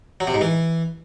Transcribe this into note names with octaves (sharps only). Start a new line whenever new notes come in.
F#3
C3
G#2
E3